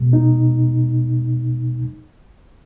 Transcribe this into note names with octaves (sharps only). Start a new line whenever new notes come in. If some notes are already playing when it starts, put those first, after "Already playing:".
Already playing: E2 B2 G#3
D#4